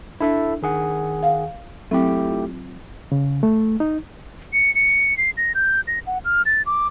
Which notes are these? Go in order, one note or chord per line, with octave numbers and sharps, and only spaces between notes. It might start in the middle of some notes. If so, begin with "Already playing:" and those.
D4 E4 A4 E5
D#3 G#4 F#5
F5
F#3 A3 C4 E4 G4
F4
C#3
A3
D#4
C#7
C#7
C7
A#6
G6
A#6
F#5
F6
A6
D6